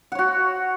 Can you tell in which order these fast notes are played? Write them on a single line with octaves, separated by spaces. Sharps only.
F#5 C#5 F#4